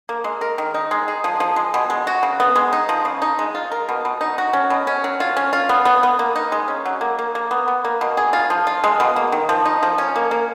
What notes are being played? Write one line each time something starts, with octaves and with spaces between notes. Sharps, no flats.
A#3
G#3
A#4
D#3
D#4
G#3
G#4
F3
F3
G#3
B2
G#3
F#4
C#3
B3
G#3
D#4
F3
C#3
D#4
G#3
F4
A#4
B2
B2
D#4
F#4
C#4
B2
C#4
F#3
F4
C#4
F4
B3
B3
B3
A#3
D#4
G#3
C#4
F#3
A#3
A#3
A#3
B3
B3
A#3
B2
G#4
F4
F3
F4
G#3
B2
A#3
D#3
F3
D#4
F3
C#4
A#3
A#3